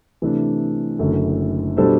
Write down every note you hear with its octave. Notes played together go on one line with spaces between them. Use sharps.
C3 E3 A3 D4
F#1 F#2 D3 A3
B2 G3 D4 A4 C5